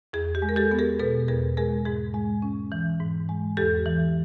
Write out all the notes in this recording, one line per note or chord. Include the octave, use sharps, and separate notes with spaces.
E2 G#4
G4
G#3
A#4
G4 A4
B3
G#4 A#4
B2 A4 B4
E2 G#4 A#4
G#3 G#4 A#4
G#2 G#4
G#3
C#4
E3
G#2
G#3
E2 G4 A4
E3